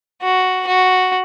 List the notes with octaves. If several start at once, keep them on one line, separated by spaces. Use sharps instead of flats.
F#4
F#4